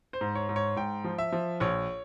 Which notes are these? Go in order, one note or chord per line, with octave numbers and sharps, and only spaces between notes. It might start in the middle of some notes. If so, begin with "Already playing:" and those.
C5
G#2
C#5
G#2
C#5
G#2 G5
F3
E5
F3
A#1 C#5